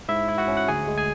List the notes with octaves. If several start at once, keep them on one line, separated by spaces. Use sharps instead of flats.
G#2 E4 E5
E4
F#4 F#5
C#4
F#5
D2 G#4 G#5
G#3
G#4 G#5